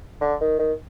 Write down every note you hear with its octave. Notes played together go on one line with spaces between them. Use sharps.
D3
D#3
D#3